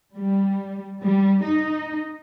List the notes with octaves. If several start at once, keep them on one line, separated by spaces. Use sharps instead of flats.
G3
G3
D#4